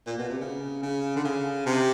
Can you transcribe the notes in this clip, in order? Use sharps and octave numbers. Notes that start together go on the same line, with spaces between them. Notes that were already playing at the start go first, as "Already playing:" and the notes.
A#2
B2
C3
C#3
C#3
D3
C#3
C3